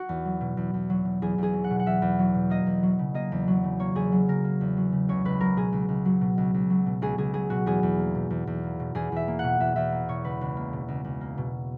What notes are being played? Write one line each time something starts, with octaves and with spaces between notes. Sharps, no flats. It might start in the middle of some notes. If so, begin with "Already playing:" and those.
Already playing: F#4
E2
F#3
B2
E2
E2
F#3
B2
E2 G#4
E2 G#4
F#3
F#5
B2
F#5
E2 E5
E2
F#3
B2
A#3 D#5
E2
F#3
C#3
A#3 D#5
E2
F#3
C#3
A#3 C#5
E2 G#4
F#3
C#3 A#4
A#3
E2
F#3
C#3
C#2 C#5
C#2 B4
F#3 A#4
B2 G#4
C#2
C#2
F#3
B2
C#2
C#2
F#3
B2
C#2 G#4
C#2 G#4
F#3 G#4
B2 F#4
E2 G#4
E2
A#3
B2
E2
E2
A#3
B2
E2 G#4
E2 E5
A#3
B2 F#5
E2 E5
E2 E5
A#3
B2 C#5
C#2 B4
C#2
A#3
B2
C#2
C#2
A#3
B2